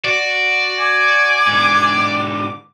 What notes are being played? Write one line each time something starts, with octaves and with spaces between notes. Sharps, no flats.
F#4 D5
G#5 D6
G#2 D3